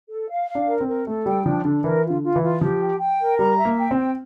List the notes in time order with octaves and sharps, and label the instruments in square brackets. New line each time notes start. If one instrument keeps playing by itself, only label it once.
[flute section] A4
F5
F5
[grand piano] D4
[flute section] A#4
[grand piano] C4
[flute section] A#4
[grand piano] A3 [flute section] A4
[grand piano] G3 [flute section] G5
[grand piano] F3 [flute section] D4
[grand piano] D3 [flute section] D4
[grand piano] E3 [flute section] A#4
[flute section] F4
[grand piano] D3
[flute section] F4
[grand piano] E3
[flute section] F4
[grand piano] F3 [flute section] G4
[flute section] G5
G5
A#4
[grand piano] G3 [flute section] A#5
[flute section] E5
[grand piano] A#3
[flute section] G5
[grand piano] C4
[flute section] G5